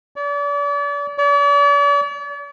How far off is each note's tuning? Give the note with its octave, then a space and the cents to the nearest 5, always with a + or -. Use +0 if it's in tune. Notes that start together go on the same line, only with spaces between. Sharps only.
D5 -40
D5 -45